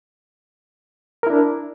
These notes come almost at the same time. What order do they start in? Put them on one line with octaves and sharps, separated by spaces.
A#4 E4 D4